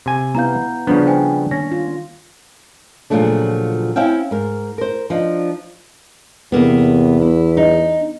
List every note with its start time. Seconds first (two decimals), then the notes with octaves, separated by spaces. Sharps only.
0.06 C3 G#5
0.35 B3 E4 F5 A#5 G6
0.87 C#3 F3 G3 B3 D4
1.06 C5 G5 G#5
1.51 D#3 A#3 C#4 A#6
1.71 F4
3.10 A#2 C#3 F3 F#3 A3 D4
3.96 C4 C#4 E4 E5 F5 G5
4.31 G#2 A#4
4.78 A#4 C5
5.10 F3 D4 D#4
6.52 E2 C3 A#3 B3
7.21 E4
7.57 D#4